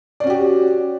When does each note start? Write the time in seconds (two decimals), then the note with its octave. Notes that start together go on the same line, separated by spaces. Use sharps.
0.20 D5
0.24 C#4
0.27 F#4
0.30 G4